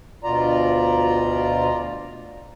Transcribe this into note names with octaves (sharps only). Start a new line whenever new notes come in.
D2 B2 F4 D5 A#5